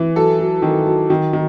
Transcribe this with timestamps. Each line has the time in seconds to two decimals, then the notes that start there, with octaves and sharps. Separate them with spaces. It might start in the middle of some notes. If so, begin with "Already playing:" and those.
Already playing: E3
0.15 F#3 A4
0.39 F#3
0.62 D#3
0.86 F#3
1.10 D#3
1.33 D#3